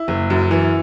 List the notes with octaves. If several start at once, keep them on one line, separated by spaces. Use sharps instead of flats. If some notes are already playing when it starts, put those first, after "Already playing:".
Already playing: E4
F#1
F#2
E3